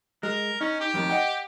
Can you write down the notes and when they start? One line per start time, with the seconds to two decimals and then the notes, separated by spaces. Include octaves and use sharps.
0.23 G#3 A#4
0.61 C#4 D#4
0.80 G4
0.94 F2 A2 D#3
1.10 D#5 F#5 G5